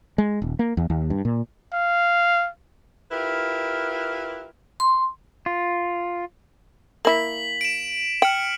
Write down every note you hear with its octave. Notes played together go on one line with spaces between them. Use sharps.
G#3
D#1
A#3
E2
D#2
G2
A#2
F5
E4 F4 G4 A#4 B4
C6
F4
A#3 E4 B6 F#7
D7 E7
G5 F6 C#7 F#7